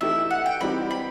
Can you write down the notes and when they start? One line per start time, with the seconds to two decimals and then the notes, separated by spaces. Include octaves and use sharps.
0.01 E3 A3 D#4 G4 E5
0.30 F#5
0.46 G5
0.61 E3 G3 C4 D#4 G4 B5
0.91 B5